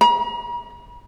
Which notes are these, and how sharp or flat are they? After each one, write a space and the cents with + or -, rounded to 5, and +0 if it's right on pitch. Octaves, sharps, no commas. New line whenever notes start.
A#5 +45